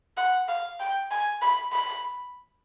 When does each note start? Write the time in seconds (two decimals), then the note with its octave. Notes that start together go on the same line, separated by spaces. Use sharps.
0.17 F#5
0.48 F5
0.80 G5
1.11 G#5
1.41 B5
1.72 B5